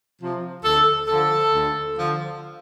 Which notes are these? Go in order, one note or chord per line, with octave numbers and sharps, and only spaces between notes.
C3 F3
D2 A4
D3 F3 A4
D2
D3 F3